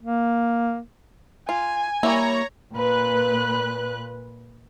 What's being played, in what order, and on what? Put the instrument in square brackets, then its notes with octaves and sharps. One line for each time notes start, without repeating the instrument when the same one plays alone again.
[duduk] A#3
[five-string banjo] F4 [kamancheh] G#5
[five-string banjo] G3 E4 [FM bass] A#3 [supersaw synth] C#5 A#5
[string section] A#2 B4 F#6